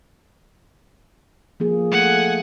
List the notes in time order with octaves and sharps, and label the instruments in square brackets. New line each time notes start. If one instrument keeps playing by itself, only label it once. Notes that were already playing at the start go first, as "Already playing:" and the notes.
[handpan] F3 A#3 G#4
[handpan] A3 [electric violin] F#5 G#5